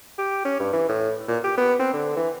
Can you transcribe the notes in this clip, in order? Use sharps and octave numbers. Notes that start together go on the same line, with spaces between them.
G4
C#4
G2
E3
A2
A#2
G4
B3
C4
D3
E3